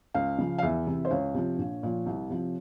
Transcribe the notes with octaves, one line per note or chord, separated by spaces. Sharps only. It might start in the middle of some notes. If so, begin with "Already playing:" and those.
C#2 F5
C#3 F3
F5
E2 E5
C3 E3
C5
C#2 C#5
C3 F3
A#1
A#2 F3
C2
C3 F3